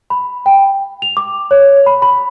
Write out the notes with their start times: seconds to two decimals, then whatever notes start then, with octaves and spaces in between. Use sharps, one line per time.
0.10 B5
0.46 G5
1.02 F7
1.17 D6
1.51 C#5
1.86 B5
2.02 B5